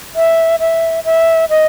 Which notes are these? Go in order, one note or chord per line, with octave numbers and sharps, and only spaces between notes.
E5
E5
E5
D#5